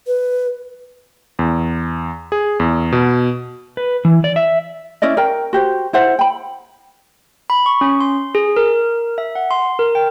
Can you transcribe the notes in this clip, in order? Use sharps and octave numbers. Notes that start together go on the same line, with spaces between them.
B4
E2
G#4
E2
B2
B4
E3
D5
E5
C#4 E4 D5 D#5
A#4 G5
F#4 G4 C5
E4 C5 F#5
G5 B5
B5
C#6
C#4
C6
G#4
A#4
E5
F#5
C6
A#4
G5